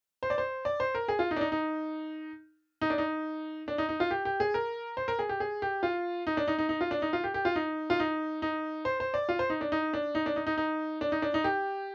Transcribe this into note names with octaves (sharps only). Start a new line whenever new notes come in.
C5
D5
C5
D5
C5
A#4
G#4
F4
D#4
D4
D#4
D#4
D#4
D4
D#4
D4
D#4
D#4
F4
G4
G4
G#4
A#4
C5
A#4
G#4
G4
G#4
G4
F4
D#4
D4
D#4
D#4
D#4
F4
D4
D#4
F4
G4
G4
F4
D#4
F4
D#4
D#4
C5
C5
D5
F4
C5
D#4
D4
D#4
D4
D#4
D4
D#4
D#4
D#4
D4
D#4
D4
D#4
G4